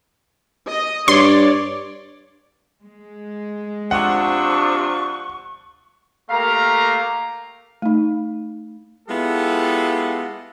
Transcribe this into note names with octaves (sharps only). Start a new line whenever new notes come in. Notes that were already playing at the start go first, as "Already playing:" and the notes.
D#5
G2 C#5 D5 C6
G#3
C3 F3 D4 F#5 C#6
A3 A#3 G4 A#4 F5 A#5
A3 D#4
G#3 B3 E4 F4 G4 A4